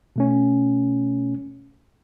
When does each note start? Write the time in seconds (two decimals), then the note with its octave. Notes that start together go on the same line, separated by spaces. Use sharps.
0.16 B2 A3 C#4